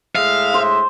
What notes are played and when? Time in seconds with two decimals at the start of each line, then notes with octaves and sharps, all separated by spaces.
0.16 A2 G#3 E5 F5
0.54 C5